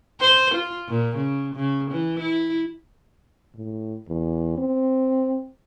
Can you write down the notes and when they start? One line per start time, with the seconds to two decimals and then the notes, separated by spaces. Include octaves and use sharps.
0.20 C5
0.55 F4
0.88 A#2
1.16 C#3
1.55 C#3
1.91 E3
2.20 E4
3.55 A2
4.09 E2
4.58 C4